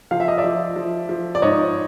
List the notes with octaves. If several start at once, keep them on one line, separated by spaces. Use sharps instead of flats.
F3 F5
E5
D#5
D5 E5
F3
F3
F3
D5
G#2 C#5 D#5